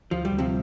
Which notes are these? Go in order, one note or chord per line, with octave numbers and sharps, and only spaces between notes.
D2 F3
G3
D2
C3 F3